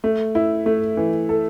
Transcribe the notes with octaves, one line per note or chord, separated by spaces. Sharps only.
A3
E4
A3
E3
A4